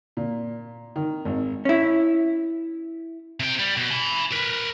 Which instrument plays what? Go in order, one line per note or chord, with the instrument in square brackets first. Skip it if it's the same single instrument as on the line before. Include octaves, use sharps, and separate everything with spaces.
[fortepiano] A#2
D#3
G#1
[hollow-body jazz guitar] C#4 E4
[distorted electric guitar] C3 G5
G3
B2
G#5 B5
A#4 B4